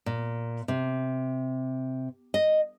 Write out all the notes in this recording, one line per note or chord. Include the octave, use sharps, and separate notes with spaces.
A#2
C3
D#5